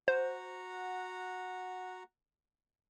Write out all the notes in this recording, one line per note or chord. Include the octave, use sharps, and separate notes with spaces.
F#4 C5 F#5 A#5